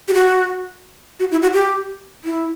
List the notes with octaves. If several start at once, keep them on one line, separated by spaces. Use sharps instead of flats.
G4
F#4
F#4
E4
F#4
G4
E4